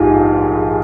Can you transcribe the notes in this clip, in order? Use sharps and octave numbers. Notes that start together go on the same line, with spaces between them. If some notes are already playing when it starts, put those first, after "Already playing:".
Already playing: A#1 G#2 D#4 F4 G4 G#4